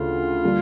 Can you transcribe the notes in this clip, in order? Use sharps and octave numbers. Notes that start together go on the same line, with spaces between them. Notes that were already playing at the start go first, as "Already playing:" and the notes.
Already playing: D2 C#3 F4
D3 G3 A#3 D4